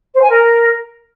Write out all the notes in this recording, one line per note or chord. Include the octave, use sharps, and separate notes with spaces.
C5
G#5
A#4